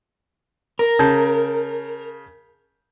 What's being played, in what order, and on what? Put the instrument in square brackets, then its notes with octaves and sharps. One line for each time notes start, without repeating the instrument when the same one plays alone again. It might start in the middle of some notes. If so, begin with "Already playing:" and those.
[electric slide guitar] A#4
[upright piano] C#3 A5 G6